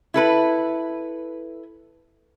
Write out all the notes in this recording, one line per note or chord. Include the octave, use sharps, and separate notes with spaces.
E4 A4 B4